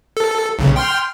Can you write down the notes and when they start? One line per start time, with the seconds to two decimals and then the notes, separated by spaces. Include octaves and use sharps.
0.17 A4
0.59 B1 C#3
0.76 G5 C6 F6